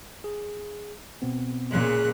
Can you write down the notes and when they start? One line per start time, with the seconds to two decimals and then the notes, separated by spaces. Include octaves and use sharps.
0.24 G#4
1.22 B2 B3 C4
1.71 A#2 C#3 G#3 G#4 F#6